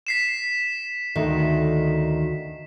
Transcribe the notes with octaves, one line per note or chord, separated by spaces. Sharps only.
B6 C7 E7
D2 D#3